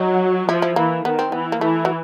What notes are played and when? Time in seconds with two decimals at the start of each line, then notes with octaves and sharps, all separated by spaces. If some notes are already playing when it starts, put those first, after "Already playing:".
Already playing: F#3 D#4
0.49 F3 E4
0.62 E4
0.76 E3 A#3
1.04 D#3 B3
1.19 C4
1.32 E3 B3
1.52 A#3
1.61 E3 A3
1.85 F#3